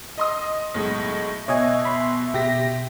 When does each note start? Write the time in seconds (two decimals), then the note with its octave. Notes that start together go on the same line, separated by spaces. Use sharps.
0.18 D#5 C6 D#6
0.74 B1 A2 G#3
1.48 B2 C#5 D#5 E5 G#5
1.85 B5 C6
2.34 B2 G4 A#6 B6